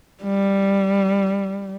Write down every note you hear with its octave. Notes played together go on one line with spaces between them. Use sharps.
G3